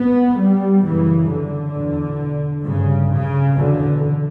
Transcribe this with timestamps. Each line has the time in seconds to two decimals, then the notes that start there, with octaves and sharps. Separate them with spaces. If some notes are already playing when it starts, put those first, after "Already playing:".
Already playing: B3
0.38 G3
0.83 F#2 C#3 E3
1.29 D3
1.74 E2 B2
2.65 G2 C#3
3.12 C#3
3.56 E2 B2 D3